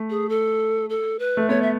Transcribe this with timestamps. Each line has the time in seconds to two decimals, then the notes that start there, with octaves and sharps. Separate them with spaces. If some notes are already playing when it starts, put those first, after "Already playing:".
Already playing: A3
0.10 G#4
0.29 A4
0.90 A4
1.19 B4
1.37 A3
1.49 B3 C#5
1.62 E5